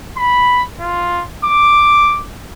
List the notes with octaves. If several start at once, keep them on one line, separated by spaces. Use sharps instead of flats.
B5
F4
D6